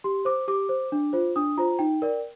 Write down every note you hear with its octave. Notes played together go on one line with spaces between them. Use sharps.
G4 C6
C5 D6
G4 D6
C5
D4
F4 C5
D4 D#6
F4 C5 A#5
D#4 G5
A#4 D5